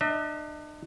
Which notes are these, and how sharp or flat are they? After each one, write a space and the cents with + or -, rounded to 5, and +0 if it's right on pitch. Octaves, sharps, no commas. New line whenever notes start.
D4 +40 E5 -45